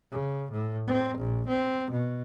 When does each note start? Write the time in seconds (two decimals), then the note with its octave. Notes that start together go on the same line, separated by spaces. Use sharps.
0.11 C#3
0.51 A2
0.87 C4
1.18 A#1
1.48 C4
1.91 B2